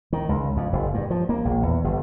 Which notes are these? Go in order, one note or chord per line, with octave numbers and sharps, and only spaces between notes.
D#3
C#2
F2
F#1
G2
F3
A#3
A#1
E2
G1